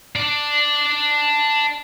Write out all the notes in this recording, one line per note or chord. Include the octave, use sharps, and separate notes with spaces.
D4 D5